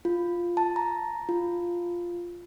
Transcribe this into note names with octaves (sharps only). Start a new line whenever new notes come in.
F4
A5
A#5
F4